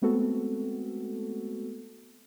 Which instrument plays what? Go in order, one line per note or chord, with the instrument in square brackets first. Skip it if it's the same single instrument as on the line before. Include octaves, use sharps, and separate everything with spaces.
[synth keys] G#3 A3 B3 C4 F#4 A4